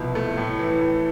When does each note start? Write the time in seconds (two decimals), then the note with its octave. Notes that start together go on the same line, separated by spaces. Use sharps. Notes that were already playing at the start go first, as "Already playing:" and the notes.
Already playing: C2 B2 F3 E4
0.15 A3
0.37 A2
0.59 E3
0.81 A2